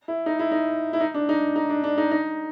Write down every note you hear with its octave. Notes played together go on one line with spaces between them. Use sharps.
E4
D#4
E4
D#4
E4
D#4
D4
D#4
D#4
D4
D4
D#4
D#4